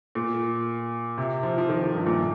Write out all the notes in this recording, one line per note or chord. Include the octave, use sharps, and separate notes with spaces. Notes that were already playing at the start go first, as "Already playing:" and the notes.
A#2
C3
F3
F3
D#3
F3
G2
A#2